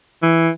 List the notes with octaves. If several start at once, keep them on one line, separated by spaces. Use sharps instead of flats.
E3